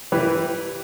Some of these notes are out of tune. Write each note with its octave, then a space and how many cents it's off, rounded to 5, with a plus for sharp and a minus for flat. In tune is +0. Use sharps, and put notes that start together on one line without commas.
E3 +0 G4 +0 B4 +0